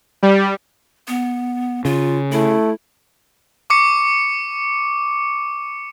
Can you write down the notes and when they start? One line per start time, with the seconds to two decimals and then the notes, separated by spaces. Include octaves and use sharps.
0.23 G3
1.08 B3
1.85 C#3 F4
2.32 A3 E4
3.70 C#6 D6 C#7